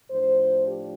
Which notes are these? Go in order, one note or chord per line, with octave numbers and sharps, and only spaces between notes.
A2 F3 D4 C5
G4